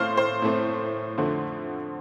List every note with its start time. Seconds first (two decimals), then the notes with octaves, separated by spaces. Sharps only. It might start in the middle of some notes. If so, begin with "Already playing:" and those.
Already playing: A2 A3 C4 C5 F5 C6 F6
0.17 C5 C6
0.42 A2 A3 C4
1.17 F2 D3 A3 C4